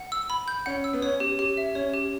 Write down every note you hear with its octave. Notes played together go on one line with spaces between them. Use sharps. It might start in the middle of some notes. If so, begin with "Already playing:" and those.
Already playing: F#5
E6
B5
G6
C#4 F#5
E6
B3
C#4 C#5
G4
G4
E5
C#4 C#5
G4